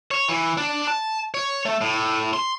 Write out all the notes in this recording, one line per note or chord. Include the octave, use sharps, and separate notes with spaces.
C#5
E3
D4
A5
C#5
A3
A2
C6